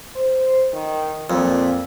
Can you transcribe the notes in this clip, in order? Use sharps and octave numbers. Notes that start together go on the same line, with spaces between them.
C5
D#3
F2 A#2